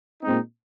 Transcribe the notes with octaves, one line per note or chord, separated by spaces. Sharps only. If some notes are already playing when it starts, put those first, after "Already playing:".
A#2 G#3 C4 D#4